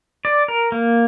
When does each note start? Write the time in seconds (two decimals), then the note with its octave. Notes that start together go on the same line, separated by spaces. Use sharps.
0.25 D5
0.48 A#4
0.72 A#3